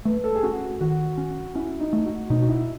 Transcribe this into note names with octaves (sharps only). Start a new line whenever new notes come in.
A3 B4
A4
G#4
C#4 F#4
D#3 F#4
C#4
C#4 E4
D#4
A3
F#4
B2 D#4
F#4
E4